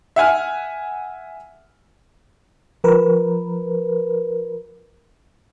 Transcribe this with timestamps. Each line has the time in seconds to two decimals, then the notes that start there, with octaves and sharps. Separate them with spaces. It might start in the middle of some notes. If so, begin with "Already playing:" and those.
0.16 E5 F#5 G#5 F6
2.84 F3 A#4 B4